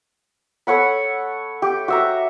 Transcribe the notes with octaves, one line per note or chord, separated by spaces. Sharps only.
A4 C#5 F#5 B5
G4
F#4 E5 A#5